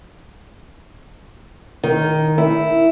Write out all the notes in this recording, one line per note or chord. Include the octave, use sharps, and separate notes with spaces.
D#3
E4